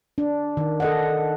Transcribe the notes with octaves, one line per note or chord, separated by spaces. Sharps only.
D4
D#3
A4 D#5 F#5